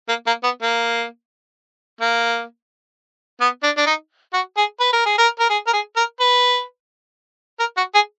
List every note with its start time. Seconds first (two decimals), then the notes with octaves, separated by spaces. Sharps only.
0.09 A#3
0.27 A#3
0.43 B3
0.62 A#3
2.01 A#3
3.41 B3
3.63 D4
3.77 D4
3.86 D#4
4.33 F#4
4.57 G#4
4.80 B4
4.93 A#4
5.06 G#4
5.18 A#4
5.40 A#4
5.50 G#4
5.67 A#4
5.73 G#4
5.96 A#4
6.20 B4
7.60 A#4
7.77 F#4
7.94 G#4